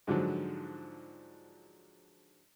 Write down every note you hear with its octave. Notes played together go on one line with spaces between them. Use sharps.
G#2 D3 F3 F#3